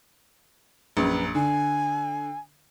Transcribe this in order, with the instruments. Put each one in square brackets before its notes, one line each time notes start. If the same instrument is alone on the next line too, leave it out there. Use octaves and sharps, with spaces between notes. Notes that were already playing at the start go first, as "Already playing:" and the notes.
[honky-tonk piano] A#1 F#2 [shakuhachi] B4
[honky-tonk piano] D3 [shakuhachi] G#5